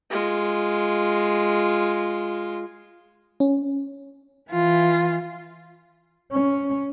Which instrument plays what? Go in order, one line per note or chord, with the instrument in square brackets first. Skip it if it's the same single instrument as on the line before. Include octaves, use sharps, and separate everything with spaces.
[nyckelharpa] G#3 F4
[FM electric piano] C#4
[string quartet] E3 F4
[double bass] C#4